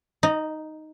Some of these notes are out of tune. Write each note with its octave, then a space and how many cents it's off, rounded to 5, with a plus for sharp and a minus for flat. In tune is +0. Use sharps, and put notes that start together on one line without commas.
D#4 +0 D#5 -40